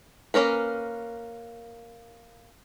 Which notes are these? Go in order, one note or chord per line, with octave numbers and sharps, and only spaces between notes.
A#3 C#4 A#4 B4